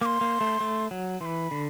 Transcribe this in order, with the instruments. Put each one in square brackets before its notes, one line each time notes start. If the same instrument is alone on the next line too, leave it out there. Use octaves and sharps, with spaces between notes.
[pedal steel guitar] A#3 [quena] D6
[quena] C6
[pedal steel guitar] A#3
A3
A3
F#3
[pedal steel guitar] E3 [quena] B5 C6
[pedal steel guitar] D3